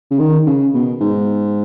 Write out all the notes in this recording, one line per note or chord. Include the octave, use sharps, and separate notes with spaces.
C#3
D#3
C#3
B2
G#2